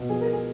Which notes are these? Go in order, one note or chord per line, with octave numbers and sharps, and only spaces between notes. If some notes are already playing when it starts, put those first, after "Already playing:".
Already playing: B2
F3 G#4
A#4
G#4